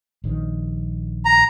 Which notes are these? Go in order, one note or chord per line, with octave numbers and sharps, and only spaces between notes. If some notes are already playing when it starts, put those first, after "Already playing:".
A#1 D#3
A#5